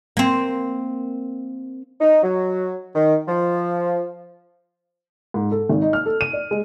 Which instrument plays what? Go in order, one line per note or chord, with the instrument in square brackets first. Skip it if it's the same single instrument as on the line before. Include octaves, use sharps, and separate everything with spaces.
[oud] A#3 C4
[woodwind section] D#4
F#3
D#3
F3
[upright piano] G#2
A4
G#1
D#4
F6
A4
D#7
D5
G#3